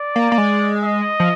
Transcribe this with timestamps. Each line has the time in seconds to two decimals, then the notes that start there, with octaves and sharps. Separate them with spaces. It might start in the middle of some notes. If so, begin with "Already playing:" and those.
Already playing: D5
0.16 A#3
0.32 A#3
0.38 G#3
0.84 D#5
1.20 F3